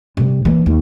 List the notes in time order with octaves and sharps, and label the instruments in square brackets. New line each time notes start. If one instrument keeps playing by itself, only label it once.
[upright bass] C3 G3
E3 A#3
D#2